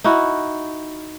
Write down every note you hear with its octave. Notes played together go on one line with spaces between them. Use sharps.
D#4 E4 F#4